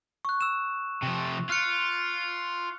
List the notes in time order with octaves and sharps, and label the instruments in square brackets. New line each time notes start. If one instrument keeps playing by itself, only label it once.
[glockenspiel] C#6 F#6
E6 E7
[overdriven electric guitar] C3 F3
[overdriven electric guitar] F4 [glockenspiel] F6 F#6 C#7